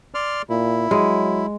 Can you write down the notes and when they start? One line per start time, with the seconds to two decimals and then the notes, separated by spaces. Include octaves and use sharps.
0.14 D5 C6 F6
0.49 A#2 E4
0.91 F#3 G#3